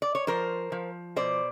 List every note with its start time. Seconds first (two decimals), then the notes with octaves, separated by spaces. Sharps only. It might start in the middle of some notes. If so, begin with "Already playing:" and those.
0.02 D5
0.15 C#5
0.27 F3 A#4 C5
0.72 F3
1.16 B2 C5 D5